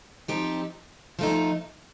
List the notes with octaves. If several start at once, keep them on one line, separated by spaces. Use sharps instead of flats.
F3 C4 D#4 G4
F3 A3 D#4